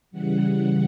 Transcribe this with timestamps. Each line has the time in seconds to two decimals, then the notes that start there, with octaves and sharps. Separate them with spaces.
0.11 C#3 E3 G3 F#5
0.40 F#5